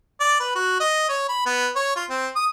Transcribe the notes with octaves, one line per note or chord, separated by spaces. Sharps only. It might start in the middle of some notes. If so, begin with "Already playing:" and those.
D5
B4
F#4
D#5
C#5
B5
B3
C#5
F4
C4
D#6